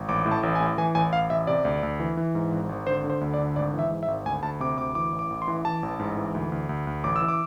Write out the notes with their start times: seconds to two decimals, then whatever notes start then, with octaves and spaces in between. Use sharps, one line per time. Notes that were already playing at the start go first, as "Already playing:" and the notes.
Already playing: G#1
0.09 A1 D6
0.26 A2
0.31 A5
0.43 A1
0.55 G#5
0.60 A2
0.78 E3 G#5
0.95 A1 G#5
1.13 A1 F5
1.30 A1 E5
1.47 C3 D5
1.65 D2
1.83 D2
2.00 E3
2.17 E3
2.35 G#2
2.52 G#1
2.69 G#1
2.87 D3 C5
3.04 D3
3.10 C5
3.21 D2
3.34 D5
3.39 D3
3.56 G#1 D5
3.74 E3
3.79 E5
3.90 G#2
4.03 E5
4.08 G#1
4.26 D2 G#5
4.43 D2 A5
4.60 C3 D6
4.78 D2 D6
4.95 E3 D6
5.13 A1
5.19 D6
5.30 A1
5.42 C6
5.48 E3
5.65 E3 A5
5.83 A1
5.99 G#2
6.17 E3
6.35 D2
6.52 D2
6.69 D2
6.87 D2
7.04 A1 D6
7.16 E6
7.22 E3
7.28 D6